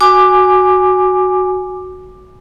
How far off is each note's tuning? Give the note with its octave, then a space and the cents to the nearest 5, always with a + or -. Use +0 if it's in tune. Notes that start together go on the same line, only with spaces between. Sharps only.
F#4 +0 G#5 +0 D6 +10